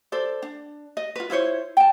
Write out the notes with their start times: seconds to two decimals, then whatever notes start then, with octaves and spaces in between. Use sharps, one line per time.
0.12 A4 C5 D5
0.42 D4
0.97 D#5
1.16 F4 B4
1.30 E4 F4 C5 C#5
1.77 G5 A5